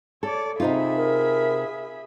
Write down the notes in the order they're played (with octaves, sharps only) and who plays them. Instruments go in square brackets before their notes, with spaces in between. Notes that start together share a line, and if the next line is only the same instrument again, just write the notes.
[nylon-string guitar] A4 [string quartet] C#5 D5
[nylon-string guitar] C3 D#4 F4 [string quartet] G#4 E5 B5
[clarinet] A#4